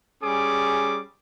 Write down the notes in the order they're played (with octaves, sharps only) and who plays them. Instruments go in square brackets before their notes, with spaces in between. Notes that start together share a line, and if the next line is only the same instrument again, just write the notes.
[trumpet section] G3 C#4 G#4 D6